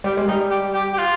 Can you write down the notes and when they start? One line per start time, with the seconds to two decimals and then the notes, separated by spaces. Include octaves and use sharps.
0.04 G3 G4
0.17 G#3
0.28 G3 D#4
0.50 G4
0.74 G4
0.93 G4
0.98 F4